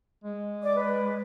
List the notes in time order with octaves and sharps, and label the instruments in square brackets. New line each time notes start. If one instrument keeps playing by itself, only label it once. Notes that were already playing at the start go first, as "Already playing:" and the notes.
[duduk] G#3
[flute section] D5 D6
B4